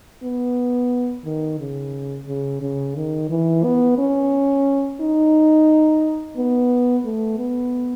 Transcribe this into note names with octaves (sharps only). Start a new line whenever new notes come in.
B3
D#3
C#3
C#3
C#3
D#3
E3
B3
C#4
D#4
B3
A3
B3